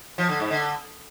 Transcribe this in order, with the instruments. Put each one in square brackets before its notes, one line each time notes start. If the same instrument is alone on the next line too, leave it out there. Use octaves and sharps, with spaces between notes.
[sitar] F3
D3
G#2
D3